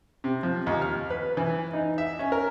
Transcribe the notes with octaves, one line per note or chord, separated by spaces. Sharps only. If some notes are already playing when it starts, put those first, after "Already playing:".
C3
F3
D#2
F6
B4
E3
D#4
E5
C#4
A#4